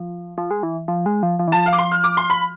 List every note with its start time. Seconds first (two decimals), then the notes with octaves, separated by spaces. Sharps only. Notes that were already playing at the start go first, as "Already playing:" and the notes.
Already playing: F3
0.38 F3
0.51 G#3
0.63 E3
0.88 F3
1.06 G#3
1.23 F3
1.39 F3
1.48 E3
1.52 F3 A5
1.66 F5
1.73 D6
1.78 C6
1.92 F6
2.04 D6
2.17 C6
2.30 B5